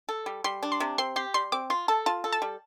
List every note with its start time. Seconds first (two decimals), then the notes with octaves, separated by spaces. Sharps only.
0.09 A4
0.26 G3
0.44 G3 C6
0.63 D4
0.72 C6
0.80 C3
0.98 C4 C6
1.16 G4 C6
1.34 G3 C6
1.52 C4 D6
1.70 F4 C6
1.88 A4 A5
2.06 F4 A5
2.24 A4
2.33 A5
2.42 G3